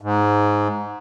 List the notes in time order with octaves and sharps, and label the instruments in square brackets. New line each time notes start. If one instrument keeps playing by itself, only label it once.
[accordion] G#2